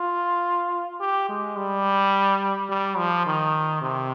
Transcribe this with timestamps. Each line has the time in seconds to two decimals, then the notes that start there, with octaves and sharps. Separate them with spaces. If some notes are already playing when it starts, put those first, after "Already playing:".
Already playing: F4
1.00 G4
1.29 G#3
1.57 G3
2.70 G3
2.98 F3
3.26 D#3
3.82 C3